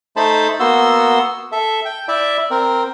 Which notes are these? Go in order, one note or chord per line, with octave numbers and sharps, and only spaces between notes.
A3 D#4 C5 A5 B5
A#3 B3 F#4 C6 E6
A4 E5
G5
E4 D5 E5
C4 A#4